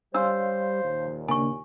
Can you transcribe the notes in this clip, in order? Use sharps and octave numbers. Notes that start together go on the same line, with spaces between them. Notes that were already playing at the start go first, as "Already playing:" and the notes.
G3 D4 C5 C#5 F5 C6 E6
D#2 A#2
C#3 A#3 D4 G#5 C#6